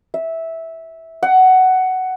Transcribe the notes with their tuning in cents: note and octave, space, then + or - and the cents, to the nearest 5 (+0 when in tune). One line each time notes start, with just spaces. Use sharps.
E5 -10
F#5 +10